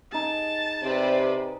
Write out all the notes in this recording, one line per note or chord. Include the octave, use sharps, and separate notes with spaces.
D#4 G#4 A5
C3 B4 C5 D5